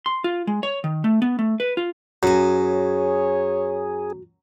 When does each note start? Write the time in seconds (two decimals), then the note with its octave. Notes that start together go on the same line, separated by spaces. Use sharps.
0.06 C6
0.24 F4
0.47 G#3
0.63 C#5
0.84 D#3
1.04 A3
1.22 B3
1.39 A3
1.60 B4
1.77 F4
2.23 F#2 F#4 G#4 G#5
2.57 C#5